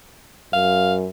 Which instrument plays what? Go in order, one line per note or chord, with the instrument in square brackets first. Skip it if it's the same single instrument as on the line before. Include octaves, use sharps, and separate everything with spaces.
[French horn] F#2 [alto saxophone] F5